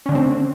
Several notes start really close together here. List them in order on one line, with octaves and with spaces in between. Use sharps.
C#4 D3 A3 C4